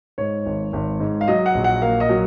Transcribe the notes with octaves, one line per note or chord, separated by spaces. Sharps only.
G#2 C#5
G#1
G#1
G#2
F5
F#3 D#5
F#5
A#1
F#5
A#3 F5
D#5
F#3